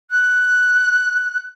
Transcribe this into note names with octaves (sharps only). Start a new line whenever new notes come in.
F#6